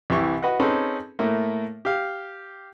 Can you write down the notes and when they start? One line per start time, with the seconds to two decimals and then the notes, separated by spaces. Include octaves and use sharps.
0.10 C2 E3 G4 C#6
0.43 F#4 B4 D#5 F#5
0.60 C4 C#4 D#4 G#4 A4 B4
1.19 A2 A3 A#3
1.85 G4 F5